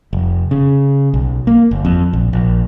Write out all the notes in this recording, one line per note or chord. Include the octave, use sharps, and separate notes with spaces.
F1
C#3
B1
A#3
G1
F2
A#1
A#1